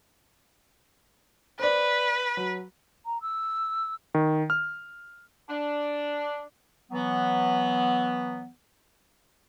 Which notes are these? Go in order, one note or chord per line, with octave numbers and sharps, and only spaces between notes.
B4 C5 D5
F#3
A#5
E6
D#3
F6
D4
E3 F#3 B3